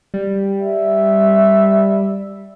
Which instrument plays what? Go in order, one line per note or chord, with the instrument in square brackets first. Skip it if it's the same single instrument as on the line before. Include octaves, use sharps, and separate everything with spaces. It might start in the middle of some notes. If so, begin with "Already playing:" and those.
[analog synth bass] G3
[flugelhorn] E5